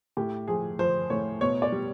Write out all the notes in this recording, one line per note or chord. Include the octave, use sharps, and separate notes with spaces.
A2 G4
F3 G#4
F3 C5
A2 C#5
B2 C#5
D5
G3